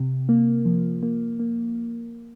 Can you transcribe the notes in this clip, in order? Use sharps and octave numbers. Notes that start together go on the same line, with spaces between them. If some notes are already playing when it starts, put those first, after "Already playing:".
Already playing: C3
A#3
F3
A#3
A#3